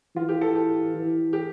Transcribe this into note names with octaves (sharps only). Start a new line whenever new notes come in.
E3 F4
G4
A4
G4
E3
G4